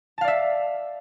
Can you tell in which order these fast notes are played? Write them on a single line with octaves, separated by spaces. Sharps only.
A5 F5 D5 E5